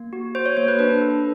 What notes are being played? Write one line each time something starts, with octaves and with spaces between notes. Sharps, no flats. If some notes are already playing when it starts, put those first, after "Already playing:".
Already playing: A#3
F#4
F#4 C5
C#5
A#3 C5
B4
D4 B4
A4